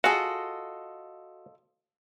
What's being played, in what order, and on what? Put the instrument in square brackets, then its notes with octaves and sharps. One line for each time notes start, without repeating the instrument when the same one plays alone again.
[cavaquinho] F4 A4 D#5 [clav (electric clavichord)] F#4 [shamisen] G#4 F5